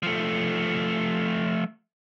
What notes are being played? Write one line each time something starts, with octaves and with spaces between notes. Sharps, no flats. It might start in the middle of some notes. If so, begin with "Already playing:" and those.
F3 A3